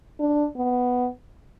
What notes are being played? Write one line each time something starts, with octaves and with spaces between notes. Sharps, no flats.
D4
B3